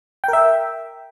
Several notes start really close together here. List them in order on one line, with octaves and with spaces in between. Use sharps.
G5 A#4 E5